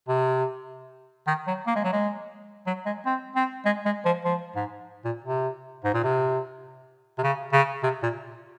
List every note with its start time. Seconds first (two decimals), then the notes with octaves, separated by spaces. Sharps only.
0.08 C3
1.27 D#3
1.47 F#3
1.67 A#3
1.76 G#3
1.84 F#3
1.93 G#3
2.67 F#3
2.86 G#3
3.06 C4
3.36 C4
3.66 G#3
3.85 G#3
4.05 F3
4.25 F3
4.56 G#2
5.05 A#2
5.25 C3
5.84 G#2
5.93 A#2
6.04 C3
7.18 C3
7.23 C#3
7.53 C#3
7.83 C3
8.03 A#2